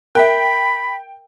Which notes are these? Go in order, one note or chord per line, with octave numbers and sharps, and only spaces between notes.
A#4 E5 G5 B5